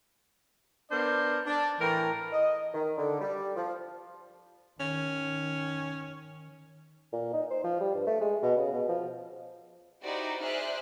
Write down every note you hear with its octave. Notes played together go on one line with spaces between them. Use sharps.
B3 D4 A#4 C5 D5
D4
A2 E3 A3 A#4 G5 A#5
D#5
D#3
D3
G3
F3
D#3 C#4
A#2
D#4
C5
F3
G3
G2
A3
G#3
B2
C#3
B2
F3
D#4 E4 F#4 G4 C5 D5
G#4 C5 D5 E5 F6 F#6